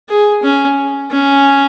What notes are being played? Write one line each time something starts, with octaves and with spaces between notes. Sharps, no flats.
G#4
C#4
C#4